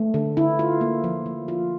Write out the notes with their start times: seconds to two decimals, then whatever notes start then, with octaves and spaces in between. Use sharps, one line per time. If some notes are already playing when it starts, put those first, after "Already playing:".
Already playing: A3
0.14 D3
0.37 E4
0.59 F4
0.81 A#3
1.04 F3
1.26 F3
1.48 F4